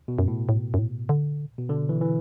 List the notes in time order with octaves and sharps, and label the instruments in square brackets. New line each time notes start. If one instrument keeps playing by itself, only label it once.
[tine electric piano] B2
[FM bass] F#2
[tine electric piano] A2
[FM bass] A2
F#2
A2
D3
[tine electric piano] B2
D3
E3
E3